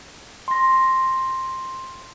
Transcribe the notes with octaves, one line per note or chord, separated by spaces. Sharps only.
C6 A#6